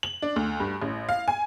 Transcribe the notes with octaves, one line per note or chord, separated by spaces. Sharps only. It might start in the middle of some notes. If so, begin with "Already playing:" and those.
F#7
D4
D2
G2
A1
F5
G#5